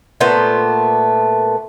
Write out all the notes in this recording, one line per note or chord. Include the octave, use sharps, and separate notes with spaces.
A#2 A3 B3 C5